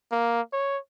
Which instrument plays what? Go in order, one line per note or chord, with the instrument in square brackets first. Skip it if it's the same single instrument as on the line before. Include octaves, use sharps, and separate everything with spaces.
[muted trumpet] A#3
C#5